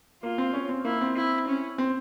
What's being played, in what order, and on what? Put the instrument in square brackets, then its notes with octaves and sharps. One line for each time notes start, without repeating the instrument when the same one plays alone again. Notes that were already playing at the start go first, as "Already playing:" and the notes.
[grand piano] A#3 [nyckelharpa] F4
[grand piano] C4
C#4
C4
[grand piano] A#3 [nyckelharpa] E4
[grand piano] C4
[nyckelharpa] E4
C#4
[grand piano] C4